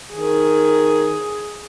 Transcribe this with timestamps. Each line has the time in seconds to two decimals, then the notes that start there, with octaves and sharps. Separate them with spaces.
0.12 D#3 G#4